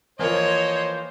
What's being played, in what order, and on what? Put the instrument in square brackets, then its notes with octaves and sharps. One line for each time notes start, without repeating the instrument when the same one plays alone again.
[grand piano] E3 F3 A#3 [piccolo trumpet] C5 [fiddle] C#5 D#5 [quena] G#6